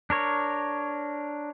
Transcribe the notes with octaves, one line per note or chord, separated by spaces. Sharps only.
D4 A#4 C#5